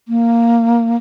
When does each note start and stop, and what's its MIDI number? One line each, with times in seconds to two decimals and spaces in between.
0.08 0.96 58